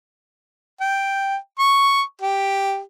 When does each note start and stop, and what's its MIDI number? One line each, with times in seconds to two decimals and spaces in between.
0.81 1.36 79
1.59 2.02 85
2.22 2.79 67